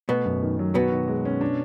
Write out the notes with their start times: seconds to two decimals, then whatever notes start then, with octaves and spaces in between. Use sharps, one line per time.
0.09 B2 A3 B3
0.26 F#2
0.42 D#3
0.59 F#3
0.75 B2 B3 F#4
0.91 D#3
1.08 G#3
1.25 C#4
1.41 D4